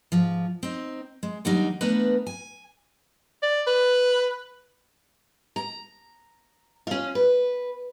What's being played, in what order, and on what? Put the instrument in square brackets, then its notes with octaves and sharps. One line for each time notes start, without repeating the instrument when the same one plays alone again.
[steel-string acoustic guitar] G#2 F3
C4 D#4
G#3
D#2 F#3 G3 D4 D#4 A#5
E3 A3 B3 D4 A#4 B4
G#5
[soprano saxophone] D5
B4
[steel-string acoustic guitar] A#5
C#4 F4
B4